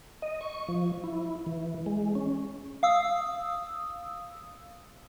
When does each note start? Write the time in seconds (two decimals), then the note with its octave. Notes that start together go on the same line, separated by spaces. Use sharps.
0.22 D#5
0.41 C#6
0.69 F3
1.04 E4
1.46 E3
1.86 G#3
2.15 C#4
2.83 F5 D#6 E6